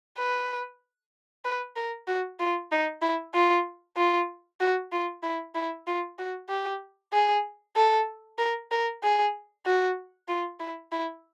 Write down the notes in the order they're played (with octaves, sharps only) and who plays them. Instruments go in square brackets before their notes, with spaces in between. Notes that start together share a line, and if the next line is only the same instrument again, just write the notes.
[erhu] B4
B4
A#4
F#4
F4
D#4
E4
F4
F4
F#4
F4
E4
E4
F4
F#4
G4
G#4
A4
A#4
A#4
G#4
F#4
F4
E4
E4